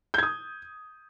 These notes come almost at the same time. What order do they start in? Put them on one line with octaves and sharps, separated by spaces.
G6 G#6 D#6